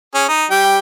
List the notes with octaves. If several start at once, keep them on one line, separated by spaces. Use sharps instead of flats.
C#4 G#4
D#4
G3 G5